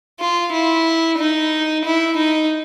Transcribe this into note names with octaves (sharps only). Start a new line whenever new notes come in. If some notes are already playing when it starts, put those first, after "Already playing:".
F4
E4
D#4
E4
D#4